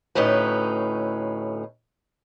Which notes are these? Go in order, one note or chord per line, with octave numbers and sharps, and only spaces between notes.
D2 A2 C#4 D#4 B4